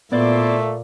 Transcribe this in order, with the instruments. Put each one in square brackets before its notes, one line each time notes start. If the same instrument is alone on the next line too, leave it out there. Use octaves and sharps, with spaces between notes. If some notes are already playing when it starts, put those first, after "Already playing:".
[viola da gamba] A#2 [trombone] A3 [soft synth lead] B3 [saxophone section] E4 C5 D5